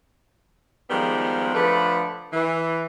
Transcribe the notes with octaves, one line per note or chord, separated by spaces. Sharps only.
D#3 F3 G3 G#3 B3
D3 F3 A3 B4
E3